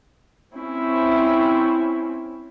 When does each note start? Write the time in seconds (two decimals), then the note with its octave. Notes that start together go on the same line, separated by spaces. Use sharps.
0.55 C4 C#4 E4